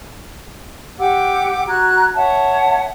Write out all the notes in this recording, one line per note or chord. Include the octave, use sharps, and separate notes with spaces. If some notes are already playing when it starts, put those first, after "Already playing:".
G4 F#5 D6 E6
F#4 A#5 F#6 G#6
C#5 E5 F#5 A5